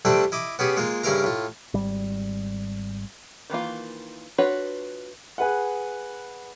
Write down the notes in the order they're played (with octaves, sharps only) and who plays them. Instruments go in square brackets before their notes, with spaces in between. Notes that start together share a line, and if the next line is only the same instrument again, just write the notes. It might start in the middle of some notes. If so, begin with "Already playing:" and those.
[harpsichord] G3 A3 C4 D4 E4 A4
E4 D#5 D6
B3 C#4 G4 G#4
G#3 A#3 F4
G2 C#3 E4 A#4 F5 A#5
A2 F4
[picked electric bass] G#1 G3
[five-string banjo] D#3 E3 A#3 F4
D4 F4 F#4 B4 C#5
[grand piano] G#4 B4 F#5